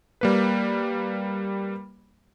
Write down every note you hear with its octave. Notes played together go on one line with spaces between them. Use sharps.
G3 A#3 B4